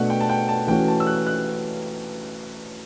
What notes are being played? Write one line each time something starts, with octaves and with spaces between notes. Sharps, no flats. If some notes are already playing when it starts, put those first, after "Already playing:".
Already playing: B2 A3 D4 F#5
G5
A5
G5
A5
E3 A3 C#4 F#4 G5
A5
E6
F#6
F#6